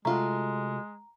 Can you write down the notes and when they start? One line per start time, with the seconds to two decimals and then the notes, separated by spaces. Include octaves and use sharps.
0.05 C3 G#3 A3 F4 F#4 A#5